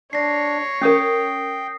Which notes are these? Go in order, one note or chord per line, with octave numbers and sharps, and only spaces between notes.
D4 C#5 A#6 C7
C#4 A#4 G5 D#6 C7